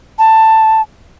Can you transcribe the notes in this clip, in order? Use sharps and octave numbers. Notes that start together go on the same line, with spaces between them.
A5